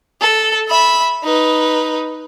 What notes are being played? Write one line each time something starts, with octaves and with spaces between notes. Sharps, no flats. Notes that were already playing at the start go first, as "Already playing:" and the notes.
A4
E5 B5
D#4 B4